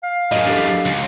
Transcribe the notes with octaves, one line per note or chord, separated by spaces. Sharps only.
F5
F#2 A2 G#4 A#4 D#5
D4 G4 A4
C#2